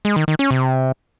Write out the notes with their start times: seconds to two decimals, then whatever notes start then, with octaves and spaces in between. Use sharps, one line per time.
0.05 G#3
0.16 D#3
0.28 D#3
0.39 C#4
0.51 C3